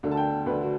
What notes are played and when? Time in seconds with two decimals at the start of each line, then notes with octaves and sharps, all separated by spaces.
0.03 D2 D3
0.11 A5
0.17 G5
0.46 D2 D3 B4
0.62 F#4